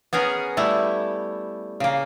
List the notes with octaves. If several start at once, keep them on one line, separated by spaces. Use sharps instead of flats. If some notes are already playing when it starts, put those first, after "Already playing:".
B3 C#4 G#4 A#4
G3 A3 E4
C#3 A#3